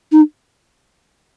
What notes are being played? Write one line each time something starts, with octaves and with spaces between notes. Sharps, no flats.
D#4